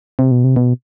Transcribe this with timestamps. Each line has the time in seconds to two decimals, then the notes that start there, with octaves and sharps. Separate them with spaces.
0.19 C3
0.31 B2
0.44 C3
0.56 B2